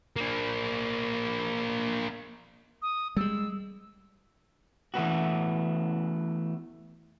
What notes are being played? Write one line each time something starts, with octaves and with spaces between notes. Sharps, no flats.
A#3 D4
D#6
G3 G#3 E6
E3 A3 B3 F#4